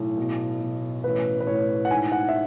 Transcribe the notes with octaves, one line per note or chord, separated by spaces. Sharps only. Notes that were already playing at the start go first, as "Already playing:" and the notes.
Already playing: B1 A2
B2
B2
A1 B4
B4
A2 C#5
F#5
G#2 G#5
F#5
E5